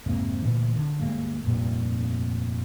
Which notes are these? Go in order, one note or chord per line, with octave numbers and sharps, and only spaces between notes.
F1 G#2 C3 A#3
D2 A#2 E3 D4
D3 D4
D2 G2 G#3 A#3
F1 G2 A#2